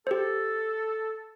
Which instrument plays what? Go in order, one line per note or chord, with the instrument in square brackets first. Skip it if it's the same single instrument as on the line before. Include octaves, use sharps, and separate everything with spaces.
[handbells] G4 C5 [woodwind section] A4